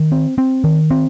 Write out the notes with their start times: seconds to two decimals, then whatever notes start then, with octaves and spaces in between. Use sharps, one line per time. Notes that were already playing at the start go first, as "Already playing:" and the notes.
Already playing: D#3
0.12 C4
0.38 C4
0.64 D#3
0.91 C4